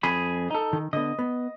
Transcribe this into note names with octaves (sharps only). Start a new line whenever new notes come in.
F2 G#4 B5
D#4 A4
D#3
D3 B3 D#5
B3